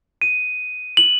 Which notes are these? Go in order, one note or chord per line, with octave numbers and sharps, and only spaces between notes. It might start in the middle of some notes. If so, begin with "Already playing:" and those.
D#7
F#7